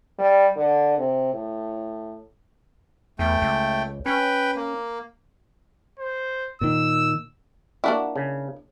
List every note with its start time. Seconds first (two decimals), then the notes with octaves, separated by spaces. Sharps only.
0.18 G3
0.56 D3
0.98 C3
1.33 A2
3.19 E2 A3 G5
3.42 C#2
4.06 C#4 B4 G5
4.56 A#3
5.99 C5
6.61 A#2 D#3 E6
7.84 A#3 D4 E4 F#4
8.16 C#3